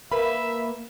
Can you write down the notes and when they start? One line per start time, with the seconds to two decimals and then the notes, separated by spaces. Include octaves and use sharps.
0.11 A#3 B4 E5 B5